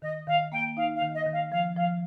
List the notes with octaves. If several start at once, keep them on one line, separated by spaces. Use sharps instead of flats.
D#3 D#5
D#3 F5
A#3 G5
D#4 F5
F5
D#3
D#5
D#3
F5
F3 F5
F3 F5